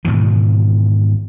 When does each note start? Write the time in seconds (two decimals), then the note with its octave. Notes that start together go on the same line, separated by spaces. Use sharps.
0.05 G#2 B2 D#3 E3